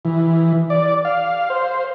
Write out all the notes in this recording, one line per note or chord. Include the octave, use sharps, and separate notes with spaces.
E3
D5
F5
C5